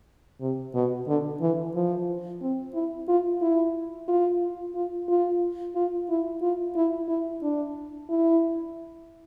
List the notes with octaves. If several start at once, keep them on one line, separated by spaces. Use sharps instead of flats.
C3
B2
D3
E3
F3
C4
E4
F4
E4
F4
F4
F4
F4
E4
F4
E4
E4
D4
E4